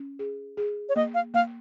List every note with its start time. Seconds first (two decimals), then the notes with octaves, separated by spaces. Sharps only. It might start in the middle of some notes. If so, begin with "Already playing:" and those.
Already playing: C#4
0.19 G#4
0.57 G#4
0.89 C#5
0.96 A#3 D#5
1.14 F5
1.34 A#3 F5